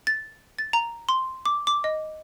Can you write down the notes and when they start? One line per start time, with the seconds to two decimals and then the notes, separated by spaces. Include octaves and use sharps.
0.07 A6
0.59 A6
0.73 A#5
1.09 C6
1.46 D6
1.67 D6
1.84 D#5